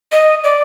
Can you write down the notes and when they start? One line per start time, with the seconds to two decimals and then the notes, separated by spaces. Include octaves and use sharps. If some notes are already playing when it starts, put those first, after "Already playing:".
0.12 D#5
0.44 D5